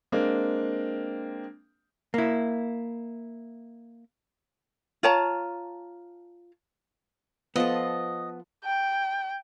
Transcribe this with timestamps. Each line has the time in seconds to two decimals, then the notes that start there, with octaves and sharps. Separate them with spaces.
0.12 G#3 A#3 C4 D4
2.14 A#3 E4
5.03 F4 C#5 A5 A#5
7.56 F3 B3 A4 D#5
8.65 G5